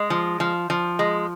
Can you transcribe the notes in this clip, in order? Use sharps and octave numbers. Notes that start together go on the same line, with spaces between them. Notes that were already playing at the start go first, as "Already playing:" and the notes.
Already playing: G#3
F3
F3
F3
G#3